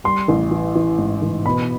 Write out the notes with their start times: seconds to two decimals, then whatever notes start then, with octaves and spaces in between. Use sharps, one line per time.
0.04 G3 C6
0.28 A1
0.51 E3
0.75 E3
0.98 G#2
1.22 A1
1.46 B2 B5